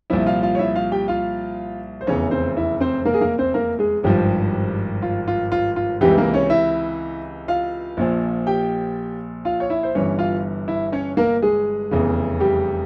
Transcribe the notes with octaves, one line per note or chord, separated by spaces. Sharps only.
C2 A#2 F3 E4 E5
F4 F5
F4 F5
C#5
E4 E5
F4 F5
G4 G5
F4 F5
C5
F1 E2 C#3 C#4 C#5
C4 C5
E4 E5
C4 C5
A#3 A#4
G#4
A#3 A#4
C4 C5
A#3 A#4
G#3 G#4
G#1 G2 F3 G3 G4
F4
F4
F4
F4
C#2 C3 E3 G3 G4
A#3 A#4
C#4 C#5
E4 E5
F4 F5
A#1 A#2 F3
G4 G5
F4 F5
C#5
E4 E5
C5
G1 G2 E3 C#4 C#5
F4 F5
E4 E5
C#4 C#5
A#3 A#4
G#3 G#4
F1 E2 C#3
G3 G4